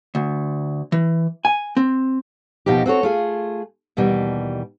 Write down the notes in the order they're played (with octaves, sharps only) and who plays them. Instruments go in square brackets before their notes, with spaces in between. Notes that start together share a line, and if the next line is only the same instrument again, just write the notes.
[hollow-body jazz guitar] D2
E3
G#5
C4
[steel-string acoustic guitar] D#2 B2 F3 D#4 G4
C4 F#4 A4 C#5
A3 F4 G#4
D#2 B2 E3 G3